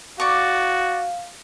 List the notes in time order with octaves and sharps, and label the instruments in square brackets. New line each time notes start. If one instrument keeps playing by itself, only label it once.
[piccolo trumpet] F#4 [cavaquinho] D5 C#6 [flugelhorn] F5